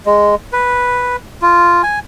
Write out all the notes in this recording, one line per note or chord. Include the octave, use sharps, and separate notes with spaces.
G#3
B4
F4
G#5